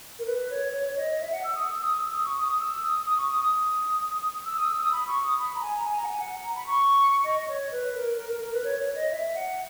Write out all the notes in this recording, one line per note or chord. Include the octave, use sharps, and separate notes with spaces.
A#4
B4
C#5
C#5
C#5
D#5
E5
F#5
E6
D#6
E6
D#6
E6
D#6
C#6
D#6
D#6
E6
D#6
D#6
C#6
D#6
D#6
E6
D#6
E6
D#6
B5
C#6
D#6
B5
A#5
G#5
A#5
G#5
A#5
F#5
G#5
F#5
A#5
B5
C#6
D#5
D#5
C#5
B4
A#4
A#4
A#4
A#4
B4
C#5
C#5
D#5
E5
F#5